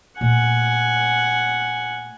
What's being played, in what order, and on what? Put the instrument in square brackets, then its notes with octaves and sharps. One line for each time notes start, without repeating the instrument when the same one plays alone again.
[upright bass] A#2 A3 [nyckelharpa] F#5 G#5